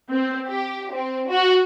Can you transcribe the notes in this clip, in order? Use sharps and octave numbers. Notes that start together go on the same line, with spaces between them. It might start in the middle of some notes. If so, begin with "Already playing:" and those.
C4
G4
C4
F#4